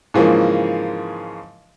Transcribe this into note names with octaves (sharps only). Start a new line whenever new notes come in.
G#2 C#3 E3 F3 A#3